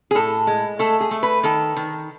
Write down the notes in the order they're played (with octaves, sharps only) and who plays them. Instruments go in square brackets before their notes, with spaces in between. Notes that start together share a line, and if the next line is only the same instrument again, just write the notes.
[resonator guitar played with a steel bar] G#4
A2 A4
G#3
A3 A4
G#4
A3
B4
D#3 A4
D#3